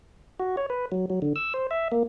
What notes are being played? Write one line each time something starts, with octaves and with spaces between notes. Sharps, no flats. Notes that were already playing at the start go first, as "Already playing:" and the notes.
F#4
C#5
B4
F#3
F#3
D3
E6
C5
E5
A#3